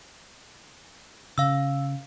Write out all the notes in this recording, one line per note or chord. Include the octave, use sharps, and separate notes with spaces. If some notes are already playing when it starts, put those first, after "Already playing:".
C#3 F5 E6